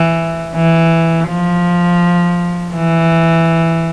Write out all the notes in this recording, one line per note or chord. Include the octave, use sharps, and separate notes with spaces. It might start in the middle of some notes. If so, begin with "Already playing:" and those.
Already playing: E3
E3
F3
E3